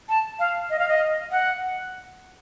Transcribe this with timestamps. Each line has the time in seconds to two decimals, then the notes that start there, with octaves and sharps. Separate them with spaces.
0.09 A5
0.39 F5
0.70 D#5
0.79 F5
0.89 D#5
1.31 F#5